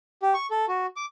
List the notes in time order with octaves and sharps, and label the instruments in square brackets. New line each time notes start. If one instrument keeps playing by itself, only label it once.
[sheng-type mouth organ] G4
C#6
A4
F#4
D6